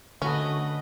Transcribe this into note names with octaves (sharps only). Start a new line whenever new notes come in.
D3 A3 C#4 F#4 A4 B4 D#5